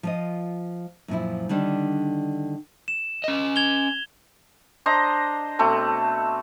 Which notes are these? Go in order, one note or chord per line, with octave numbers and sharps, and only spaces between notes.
F3 F4 D#5
F#2 A#2 F3 E4
D3 D#3 G3 D4
E7
C#4 D#5
G#6 F7 G7
D4 C5 D#5 A#5
B2 A3 C4 A5